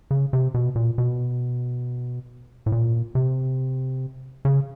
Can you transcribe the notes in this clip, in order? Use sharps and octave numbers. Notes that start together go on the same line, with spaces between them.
C#3
C3
B2
A#2
B2
A2
A#2
C3
C#3